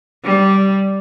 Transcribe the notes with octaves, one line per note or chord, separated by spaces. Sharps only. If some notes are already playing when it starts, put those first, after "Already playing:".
G3